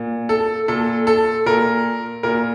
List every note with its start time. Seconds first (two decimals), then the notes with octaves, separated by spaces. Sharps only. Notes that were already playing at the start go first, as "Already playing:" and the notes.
Already playing: A#2
0.29 A4
0.68 A#2 A4
1.07 A4
1.46 A#2 A#4
2.23 A#2 A#4